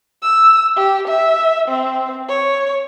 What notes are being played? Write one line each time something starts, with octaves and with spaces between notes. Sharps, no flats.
E6
G4
E5
C4
C#5